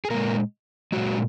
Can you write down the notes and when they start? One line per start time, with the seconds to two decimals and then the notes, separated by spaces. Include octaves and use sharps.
0.05 G#4
0.10 A#2 G#3 A#3 A#4
0.92 A#2 F#3 G#3 F#4